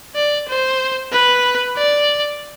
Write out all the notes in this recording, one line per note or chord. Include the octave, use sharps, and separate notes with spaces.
D5
C5
B4
D5